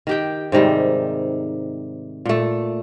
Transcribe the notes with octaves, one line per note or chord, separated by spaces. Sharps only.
D#3 G4 G5
G#2 C3 D#3 G3
A#2 A3